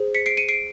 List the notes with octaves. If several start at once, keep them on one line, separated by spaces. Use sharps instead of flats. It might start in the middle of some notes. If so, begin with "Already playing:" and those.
Already playing: G#4 C5
B6 C#7
C7 D7
C#7 D#7
C7 D7